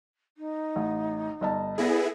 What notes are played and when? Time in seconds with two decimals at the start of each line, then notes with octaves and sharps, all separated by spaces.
0.38 D#4
0.76 A1
1.41 G1 D#5 A5
1.78 B3 E4 G#4 A4 D5 A#6